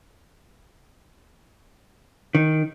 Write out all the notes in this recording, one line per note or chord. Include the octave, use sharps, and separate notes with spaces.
D#3